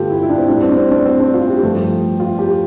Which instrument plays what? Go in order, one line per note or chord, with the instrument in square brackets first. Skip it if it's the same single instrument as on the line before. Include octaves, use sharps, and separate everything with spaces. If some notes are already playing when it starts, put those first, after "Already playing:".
Already playing: [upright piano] G2 D3 A3 F4 G4 A4
E4
E4
D4
C4
A2 G3 D4
C4
D4
C4
D4
C4
D4
F4
G4
G2 F3 A3
F4
G4